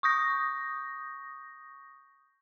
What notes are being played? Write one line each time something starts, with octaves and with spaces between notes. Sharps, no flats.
C#6 D#6 G6 A#6